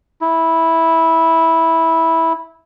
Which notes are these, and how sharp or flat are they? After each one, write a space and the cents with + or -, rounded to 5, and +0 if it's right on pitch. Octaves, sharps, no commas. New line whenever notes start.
E4 -10